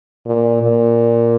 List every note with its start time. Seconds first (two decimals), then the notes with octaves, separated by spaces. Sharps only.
0.26 A#2
0.63 A#2